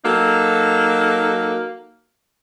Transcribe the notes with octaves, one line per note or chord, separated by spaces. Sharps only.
F#3 A#3 D#4 A4